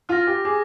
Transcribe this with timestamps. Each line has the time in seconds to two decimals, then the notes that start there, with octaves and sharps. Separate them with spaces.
0.09 F4 F6 A#6
0.27 G4
0.45 G#4 D6